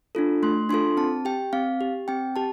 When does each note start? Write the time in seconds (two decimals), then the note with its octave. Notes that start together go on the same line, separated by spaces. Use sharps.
0.15 D4 F4 A4
0.43 A3 C6
0.69 D4 F4 A4 C6
0.97 C4 A5
1.25 G4 G5
1.53 C4 F5
1.81 G4
2.08 C4 G5
2.36 G4 A5